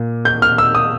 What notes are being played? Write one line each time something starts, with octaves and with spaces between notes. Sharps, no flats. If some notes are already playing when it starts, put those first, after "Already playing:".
Already playing: A#2
G6
F6
E6
D#6